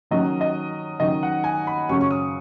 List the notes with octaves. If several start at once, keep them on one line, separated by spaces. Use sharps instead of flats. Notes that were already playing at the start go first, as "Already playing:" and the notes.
D#3 F#3 C#4 D#5
D#5
D#3 F#3 C#4 D#5
F#5
G#5
B5
F#2 C#3 F#3 C#4 C#6
C#6
D#6